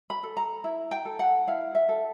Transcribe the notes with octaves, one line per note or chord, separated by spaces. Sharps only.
B5
A4
A#5
E4
G5
A4
F#5
E4 F5
E5
A4